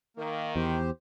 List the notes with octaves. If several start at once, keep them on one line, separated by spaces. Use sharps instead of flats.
D#3 A#3
E2 G4 C5